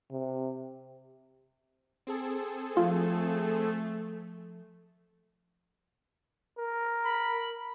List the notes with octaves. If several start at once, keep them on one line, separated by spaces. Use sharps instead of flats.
C3
C4 G#4 A4
F3 A3 F4
A#4
B5